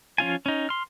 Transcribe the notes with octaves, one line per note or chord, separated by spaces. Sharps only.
F3 C#4 F4 G#5
C#4 D#4
C6 F6